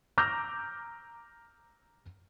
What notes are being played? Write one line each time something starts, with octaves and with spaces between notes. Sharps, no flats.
A#5 D6 E6 F6 G6 A#6